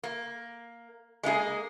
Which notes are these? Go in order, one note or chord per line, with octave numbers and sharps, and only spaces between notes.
A#3
G#3 A#3 D#4 G#4